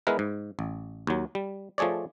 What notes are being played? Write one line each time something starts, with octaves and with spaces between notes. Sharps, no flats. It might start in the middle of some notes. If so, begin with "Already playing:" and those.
G#3 B3 E4 A#4 B4
G#2
A1
D#2 F#3
G3
F3 A3 G#4 C#5 D5